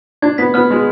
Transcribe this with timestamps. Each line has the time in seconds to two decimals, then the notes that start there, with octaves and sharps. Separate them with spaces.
0.22 D4 G#6
0.38 B3 B6
0.54 B3 F6
0.70 G#3 C6